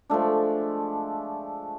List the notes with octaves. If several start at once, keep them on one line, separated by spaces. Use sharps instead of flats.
F3 G#3 A3 D4